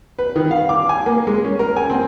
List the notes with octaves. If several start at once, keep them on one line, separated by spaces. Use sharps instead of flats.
B4
D#3
F5
D6
G#5
A#3
G#3
C#4
A#4
G#5
C4